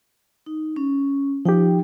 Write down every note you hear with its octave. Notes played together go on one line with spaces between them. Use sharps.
D#4
C#4
F3 D#4 G4 G5